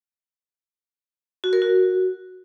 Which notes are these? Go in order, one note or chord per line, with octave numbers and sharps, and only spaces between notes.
F#4
A#4
F#4